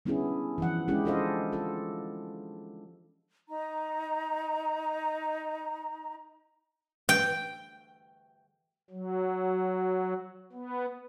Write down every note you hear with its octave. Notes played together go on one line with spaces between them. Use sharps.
G3 B3 C#4 D4 E4 G#4
E3 F3 F#5
G#3 C#4 D4 E4 G4 G#4
D4 F4 A4 C5 D#5 F5
F4 A4
D#4 A#5
G5
F#3
B3